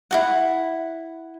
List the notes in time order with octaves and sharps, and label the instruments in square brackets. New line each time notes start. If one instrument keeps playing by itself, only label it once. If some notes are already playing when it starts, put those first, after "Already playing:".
[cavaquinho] E4 F#4 F#5